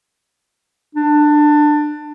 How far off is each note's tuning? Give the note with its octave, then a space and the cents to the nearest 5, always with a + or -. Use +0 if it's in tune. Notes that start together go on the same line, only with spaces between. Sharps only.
D4 +20